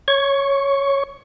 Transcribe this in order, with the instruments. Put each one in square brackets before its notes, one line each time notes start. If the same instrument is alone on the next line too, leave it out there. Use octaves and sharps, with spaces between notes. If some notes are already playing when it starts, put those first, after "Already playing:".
[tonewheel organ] C#5 C#6